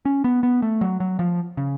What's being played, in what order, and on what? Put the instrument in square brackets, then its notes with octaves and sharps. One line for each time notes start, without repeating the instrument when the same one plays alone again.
[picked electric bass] C#4
B3
B3
A3
F#3
F#3
F3
C#3